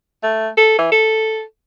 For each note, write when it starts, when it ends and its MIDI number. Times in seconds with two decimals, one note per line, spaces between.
0.23 0.49 57
0.57 0.75 69
0.78 0.89 52
0.92 1.42 69